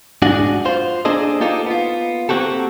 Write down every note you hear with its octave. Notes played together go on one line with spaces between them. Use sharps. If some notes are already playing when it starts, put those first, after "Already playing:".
G#2 D4 F#4 G#4 F#5
F4 C5
A#3 D4 G#4 A4 C5 D#5
A#3 D#4 F4 G4 A4 D#5
B3 F4
A#3 C4 F#4 G4 A4